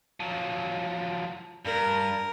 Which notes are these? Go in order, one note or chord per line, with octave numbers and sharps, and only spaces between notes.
F3 F#3
G2 A#4